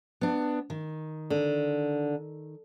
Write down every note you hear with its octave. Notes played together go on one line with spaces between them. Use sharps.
B3 D4
D#3
D3